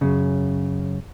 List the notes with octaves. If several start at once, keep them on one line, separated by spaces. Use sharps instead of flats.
F#2 C#3